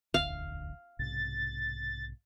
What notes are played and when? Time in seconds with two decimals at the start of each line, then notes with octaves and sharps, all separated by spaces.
0.14 E1 A1 D2 F5
0.99 B1 G#2 C3 A6